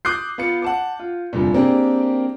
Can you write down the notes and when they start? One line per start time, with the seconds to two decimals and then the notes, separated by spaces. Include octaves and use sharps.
0.05 D6 D#6 F#6 G6 C7
0.38 B3 F4 C#7
0.62 F#5 A5 D6
0.99 F4
1.33 F1 G2 A#2
1.54 A#3 C4 D4 G4 G#4 A#4